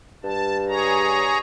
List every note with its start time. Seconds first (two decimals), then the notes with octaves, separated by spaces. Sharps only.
0.24 G2 A5
0.68 G#4 C#5 A#5